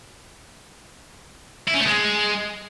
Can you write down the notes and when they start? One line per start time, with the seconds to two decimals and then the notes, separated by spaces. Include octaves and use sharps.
1.68 E4
1.74 C#4
1.80 A3
1.86 G#3